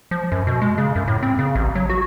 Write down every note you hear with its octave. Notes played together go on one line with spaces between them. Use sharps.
F3
F#2
B2
G#3
C#3
F#2
A2
C4
C#3
A1
F#3
F#4